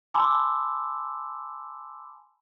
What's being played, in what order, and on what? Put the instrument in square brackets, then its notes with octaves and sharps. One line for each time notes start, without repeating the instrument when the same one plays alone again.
[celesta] G#5 A5 B5 C6 D6 E6